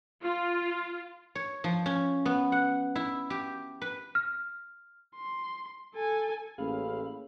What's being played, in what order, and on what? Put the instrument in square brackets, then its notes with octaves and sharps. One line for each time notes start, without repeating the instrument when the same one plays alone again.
[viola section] F4
[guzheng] C#5
F3
C#4
B3
F#5
E4
G4
B4
[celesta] F6
[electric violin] C6
A4 G#5
[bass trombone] A1 [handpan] A#3 C#4 G#4 [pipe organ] A4 B5 [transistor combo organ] F5